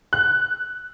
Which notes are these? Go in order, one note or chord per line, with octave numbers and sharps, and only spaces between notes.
F#6